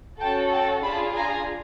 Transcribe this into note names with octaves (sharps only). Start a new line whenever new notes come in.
C#4 F#4 A4 G5 A5
G5 A5
D4 F4 G#4 A5 B5
G#5 A#5